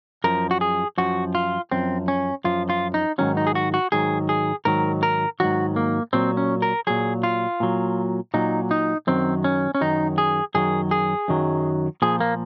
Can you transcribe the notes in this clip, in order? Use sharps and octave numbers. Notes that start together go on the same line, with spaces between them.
F#2 F3 A#4
F#4
G#4
F#2 F3 F#4
F4
F#2 F3 C4
C#4
F#2 F3 F4
F4
D#4
G#2 D#3 F#3 C#4
D#4
G#4
F#4
F#4
G#2 D#3 F#3 G#4
G#4
G#2 D#3 F#3 A#4
A#4
G#2 D#3 F#3 F#4
A#3
A#2 F#3 C4
C#4
A#4
A#2 F#3 G#4
F4
A#2 F#3
A#2 F#3 D#4
D#4
F#2 D#3 F#3 C4
C#4
C#4
F#2 D#3 F#3 D#4
G#4
F#2 D#3 F#3 G#4
G#4
F#2 D#3 F#3
A#2 F3 G#4
A#3